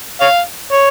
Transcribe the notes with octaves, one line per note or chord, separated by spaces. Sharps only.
C#5 F5
C#5